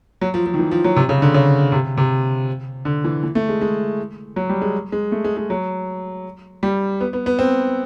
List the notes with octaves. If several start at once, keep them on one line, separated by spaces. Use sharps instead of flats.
F#3
F3
F3
D#3
E3
F3
F#3
C3
C#3
D3
C#3
C3
C3
D3
E3
E3
A3
G#3
G#3
F#3
G3
G#3
G#3
A3
G#3
G#3
F#3
G3
B3
B3
B3
C4